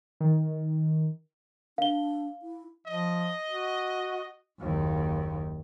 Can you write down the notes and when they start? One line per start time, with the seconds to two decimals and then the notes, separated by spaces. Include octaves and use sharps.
0.20 D#3
1.78 D4 F5 G7
2.42 E4
2.87 F3 D#5
3.49 F#4
4.60 F#1 D#2